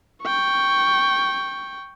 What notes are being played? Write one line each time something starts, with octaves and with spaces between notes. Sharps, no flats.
G5 C#6